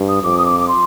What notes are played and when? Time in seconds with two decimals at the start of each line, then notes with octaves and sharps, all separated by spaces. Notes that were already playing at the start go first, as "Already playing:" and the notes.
Already playing: G2
0.08 D#6
0.23 F2 D6
0.38 D#6
0.46 D6
0.60 D6
0.68 C6